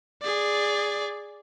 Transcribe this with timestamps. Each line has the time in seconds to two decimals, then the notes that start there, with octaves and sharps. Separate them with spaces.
0.22 G#4 D5